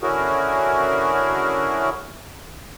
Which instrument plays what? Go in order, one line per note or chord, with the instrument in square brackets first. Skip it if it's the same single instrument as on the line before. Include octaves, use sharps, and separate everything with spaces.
[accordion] D3 C#4 E4 F#4 G#4 A#4